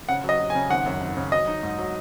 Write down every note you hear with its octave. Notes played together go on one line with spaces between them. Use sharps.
C#3 F#5
F#3 D#5
F#3
G#5
C#3
G#1 F#5
F#2
G#1
C#3
F#3 D#5
D#4
G#2
F#3